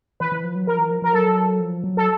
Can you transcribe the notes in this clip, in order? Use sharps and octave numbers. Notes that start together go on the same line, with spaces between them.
E3 B4
E3
F3
F#3
F3 A#4
E3
F3
F3 A#4
F#3 A4
F3
F#3
A4